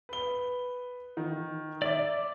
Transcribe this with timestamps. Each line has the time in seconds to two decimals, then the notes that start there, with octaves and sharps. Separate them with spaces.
0.09 B4 G7
1.17 D#3
1.82 D5 E5 D6